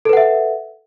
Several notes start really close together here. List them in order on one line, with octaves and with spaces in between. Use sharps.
A4 B4 F#5 E5